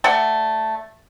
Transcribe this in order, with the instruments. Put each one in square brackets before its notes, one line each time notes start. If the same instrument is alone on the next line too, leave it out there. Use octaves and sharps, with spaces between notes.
[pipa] A3 D5 F#5 G5